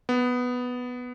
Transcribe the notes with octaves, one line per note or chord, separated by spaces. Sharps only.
B3